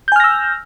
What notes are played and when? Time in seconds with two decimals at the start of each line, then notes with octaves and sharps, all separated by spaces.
0.08 G6
0.12 G#5
0.16 F6
0.20 A#6
0.24 E6